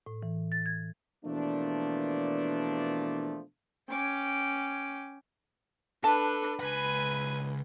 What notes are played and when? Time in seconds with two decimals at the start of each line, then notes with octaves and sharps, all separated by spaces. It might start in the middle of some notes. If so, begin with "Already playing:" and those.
0.06 A2
0.23 E3
0.52 A6
0.66 G#6
1.25 B2 E3 F3 A3 A#3 D4
3.88 C#4 G5 D6
6.04 D4 A4 B4 A5
6.60 C#2 B4 G#5 B5